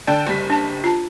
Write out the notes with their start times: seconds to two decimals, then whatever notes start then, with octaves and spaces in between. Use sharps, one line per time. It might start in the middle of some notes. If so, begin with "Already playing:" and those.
0.07 D3 D5 G5 A5
0.27 F#1 G3 B6
0.50 D4 A5
0.84 F4 A5